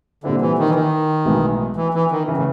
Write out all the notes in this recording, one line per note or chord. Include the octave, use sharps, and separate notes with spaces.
A#2 D3 G3 C4 E4
E3
D#3
E3
D#3
B1 A2 E3 G#3 B3
E3
E3
D#3
C#3 E3
A2